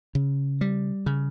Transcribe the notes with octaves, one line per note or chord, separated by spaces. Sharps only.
C#3
G3
C#3